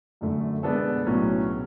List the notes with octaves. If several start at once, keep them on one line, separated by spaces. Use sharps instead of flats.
F#2 D3 A3
B2 G#3 B3 D4 A4
B1 A2 F#3 C#4